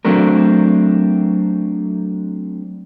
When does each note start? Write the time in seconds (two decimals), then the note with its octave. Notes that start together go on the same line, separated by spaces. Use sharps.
0.05 F#3 A3 C4 D4 A#4